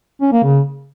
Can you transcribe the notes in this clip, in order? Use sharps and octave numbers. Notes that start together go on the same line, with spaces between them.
C#4
A#3
C#3